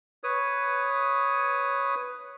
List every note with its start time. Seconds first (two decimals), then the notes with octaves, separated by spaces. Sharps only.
0.24 B4 C#5 D#6